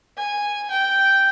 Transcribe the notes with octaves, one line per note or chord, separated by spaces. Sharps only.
G#5
G5